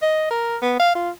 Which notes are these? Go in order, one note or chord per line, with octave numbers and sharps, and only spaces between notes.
D#5
A#4
B3
F5
F4